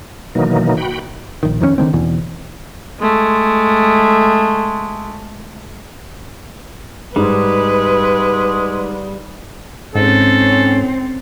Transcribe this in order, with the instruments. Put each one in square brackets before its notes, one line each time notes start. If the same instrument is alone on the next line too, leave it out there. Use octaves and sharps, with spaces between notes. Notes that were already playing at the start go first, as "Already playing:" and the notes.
[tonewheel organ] B2 D#3 E3 F#3 A#3 D#4
F#4 G5 B5
[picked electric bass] A#1 D#3
F2 D#3 A#3 C#4
D3 D#3 G#3 C4
E2 B2 E3
[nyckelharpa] G#3 A3
[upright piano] G#2 [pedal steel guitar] G3 [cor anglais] G#3 [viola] B4
[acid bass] G#2 [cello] C4 [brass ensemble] C#4 [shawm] A4